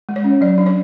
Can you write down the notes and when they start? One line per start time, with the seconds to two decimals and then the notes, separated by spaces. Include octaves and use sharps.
0.09 G#3
0.16 C#5
0.24 C#4
0.41 F#3 D5
0.58 D4
0.66 C#5